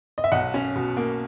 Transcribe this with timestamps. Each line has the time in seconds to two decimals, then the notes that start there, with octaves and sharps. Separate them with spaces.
0.18 D#5
0.24 E5
0.32 B1 D#5 F#5
0.54 C#4
0.76 B2
0.97 A#3